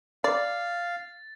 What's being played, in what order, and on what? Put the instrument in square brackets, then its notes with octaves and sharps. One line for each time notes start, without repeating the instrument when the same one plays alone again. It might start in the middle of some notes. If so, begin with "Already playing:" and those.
[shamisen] D5 [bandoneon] F5 [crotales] A6